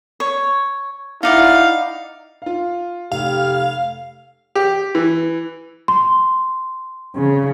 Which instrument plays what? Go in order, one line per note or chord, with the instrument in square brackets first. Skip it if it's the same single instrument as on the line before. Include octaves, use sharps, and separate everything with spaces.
[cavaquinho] C#5
[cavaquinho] D#4 D5 F#5 [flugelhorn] E4 [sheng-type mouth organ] F5
[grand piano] F4 F5
[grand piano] F1 [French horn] G4 [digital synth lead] F5
[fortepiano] G4
E3
[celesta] C6
[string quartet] C#3